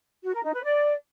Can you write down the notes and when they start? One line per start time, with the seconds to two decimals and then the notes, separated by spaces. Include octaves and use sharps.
0.23 F#4
0.33 A#4
0.43 D#4
0.53 B4
0.63 D5